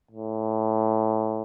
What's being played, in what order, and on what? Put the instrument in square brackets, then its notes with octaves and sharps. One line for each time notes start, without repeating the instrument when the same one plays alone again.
[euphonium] A2